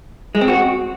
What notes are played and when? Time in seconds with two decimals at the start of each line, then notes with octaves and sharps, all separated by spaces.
0.35 G#3
0.41 C4
0.48 F#4